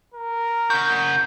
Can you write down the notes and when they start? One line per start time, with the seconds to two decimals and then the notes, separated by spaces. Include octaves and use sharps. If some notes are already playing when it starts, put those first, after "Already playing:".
0.14 A#4
0.70 C#3 F#4 G6